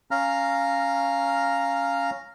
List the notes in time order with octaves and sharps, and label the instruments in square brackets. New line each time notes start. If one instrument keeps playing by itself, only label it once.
[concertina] C#4 F5 A#5 F6